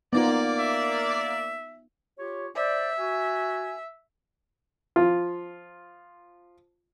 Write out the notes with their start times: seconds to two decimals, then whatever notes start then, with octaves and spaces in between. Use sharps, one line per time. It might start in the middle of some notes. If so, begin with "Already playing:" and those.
0.13 A#3 B3 D#4 F4 D5
0.59 E5
2.19 F4 G4 C#5
2.56 C5 D5 E5
2.98 F#4 G#5
4.96 F3 F4